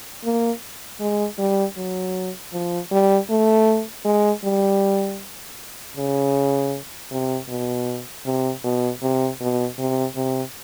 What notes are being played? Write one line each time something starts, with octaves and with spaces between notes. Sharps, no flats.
A#3
G#3
G3
F#3
F3
G3
A3
G#3
G3
C#3
C3
B2
C3
B2
C3
B2
C3
C3